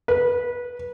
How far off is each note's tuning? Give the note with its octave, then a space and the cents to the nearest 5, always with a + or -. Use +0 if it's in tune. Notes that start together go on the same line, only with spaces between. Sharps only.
B4 -20